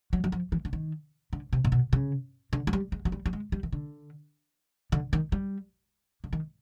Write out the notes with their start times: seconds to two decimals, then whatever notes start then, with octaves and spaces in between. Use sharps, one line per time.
0.13 F#3
0.24 F#3
0.32 F3
0.52 E3
0.65 D3
0.73 D#3
1.33 D3
1.53 C3
1.65 A#2
1.72 B2
1.93 C#3
2.53 D3
2.67 G#3
2.73 G3
2.92 G#3
3.05 F#3
3.12 G3
3.26 G3
3.33 G#3
3.52 G3
3.63 D#3
3.72 D3
4.92 D3
5.13 D#3
5.32 G3
6.24 D3
6.33 D#3